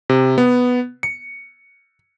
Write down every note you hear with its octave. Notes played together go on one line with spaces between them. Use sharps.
C3
B3
C#7